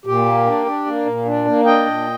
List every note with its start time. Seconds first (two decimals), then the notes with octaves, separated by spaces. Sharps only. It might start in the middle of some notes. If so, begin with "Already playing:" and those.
0.06 A#2 G4
0.26 A#3
0.46 D4
0.66 D4
0.86 A#3
1.06 A#2
1.25 D4
1.45 A#3
1.65 D4 D#5 G5
1.85 A#2